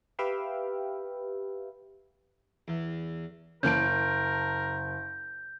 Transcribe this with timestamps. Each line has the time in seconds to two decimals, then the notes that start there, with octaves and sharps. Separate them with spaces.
0.19 G4 B4 E5 F5 G5
2.68 E2
3.63 F#1 E3 A#3 C#4 A#4 A5 G6 D7